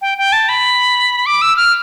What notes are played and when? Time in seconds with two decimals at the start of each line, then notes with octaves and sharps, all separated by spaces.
0.02 G5
0.18 G5
0.33 A5
0.49 B5
1.26 D6
1.42 E6
1.56 F6